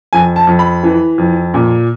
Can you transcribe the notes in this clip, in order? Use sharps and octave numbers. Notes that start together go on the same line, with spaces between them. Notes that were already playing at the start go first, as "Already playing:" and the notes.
F2 G#5
A5
F2
B5
E3
F2
A#2